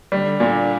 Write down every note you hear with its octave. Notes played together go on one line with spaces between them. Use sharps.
D3 G3
A#2